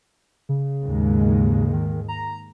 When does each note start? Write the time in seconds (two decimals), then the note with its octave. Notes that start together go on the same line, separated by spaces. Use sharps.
0.49 C#3
0.84 D#2 G#2 G#3
1.73 D#3
2.08 A#5